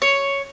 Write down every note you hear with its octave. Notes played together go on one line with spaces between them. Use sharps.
C#5